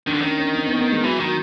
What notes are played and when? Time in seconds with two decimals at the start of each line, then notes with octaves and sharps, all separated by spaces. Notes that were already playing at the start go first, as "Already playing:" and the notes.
0.07 D#3 D4
0.14 D3
0.21 D#3 C#4
0.39 C#4
0.55 C4
0.66 B3
0.79 B3
0.91 G#3
1.03 E3 F#3
1.20 D#3 F#3